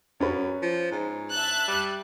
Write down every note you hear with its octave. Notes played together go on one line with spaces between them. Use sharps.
F#2 C#4 B4
F3
G#2
E5 A5 F#6
G3